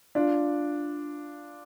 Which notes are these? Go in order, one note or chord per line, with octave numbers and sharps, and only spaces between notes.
D4 F4